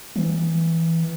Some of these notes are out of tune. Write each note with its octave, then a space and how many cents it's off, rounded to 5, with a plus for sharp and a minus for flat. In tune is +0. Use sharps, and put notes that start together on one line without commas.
E3 -5